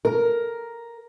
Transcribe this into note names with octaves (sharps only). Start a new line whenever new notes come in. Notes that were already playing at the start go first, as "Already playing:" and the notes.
A#4